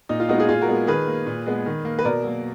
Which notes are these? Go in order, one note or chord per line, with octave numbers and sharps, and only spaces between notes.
A#2 D#4
F4
G#3 B3 D#4 F#4
F4 G#4
A#2 F4 G#4
F#4 A#4
G#3 B3
D#3 G#4 B4
A#3
A#2
G#3 B3
D#3
A#3
B4
B2 A#4 D5
F#3 A#3